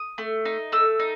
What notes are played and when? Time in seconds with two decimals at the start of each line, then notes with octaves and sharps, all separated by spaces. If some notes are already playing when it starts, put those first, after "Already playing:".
Already playing: D#6
0.18 A3
0.45 D#4
0.72 A3 E6
1.00 D#4